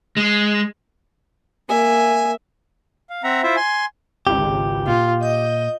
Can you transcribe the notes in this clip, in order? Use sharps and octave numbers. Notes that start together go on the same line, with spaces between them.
G#3
A#3 E5 G#5
F5
C4 E5 F#5 A#5
E4 F4 C5 E5
G#5 C6
G#1 C#2 G4
A#2 F4
D#5 G6